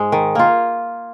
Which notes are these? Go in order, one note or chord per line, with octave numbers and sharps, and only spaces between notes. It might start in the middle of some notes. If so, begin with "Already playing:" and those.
Already playing: G#2 G#3
D#3
A#3 F4